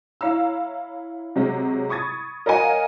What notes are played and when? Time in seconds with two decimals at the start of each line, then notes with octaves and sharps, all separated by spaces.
0.21 E4 C#5 F5 A#5 E6
1.36 C3 F#3 G#3 C#4
1.89 B5 C#6 D#6 G#6 A6
2.46 A#4 C#5 D#5 F5 F#5 G#5